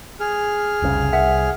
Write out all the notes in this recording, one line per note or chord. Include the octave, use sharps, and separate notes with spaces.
G#4 F6
F1 C2 C#3
C2 E5 F#5